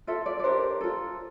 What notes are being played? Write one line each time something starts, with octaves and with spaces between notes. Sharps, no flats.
F4 A4 E5
D5
D5
D4 G4 A#4 C5
F4 A4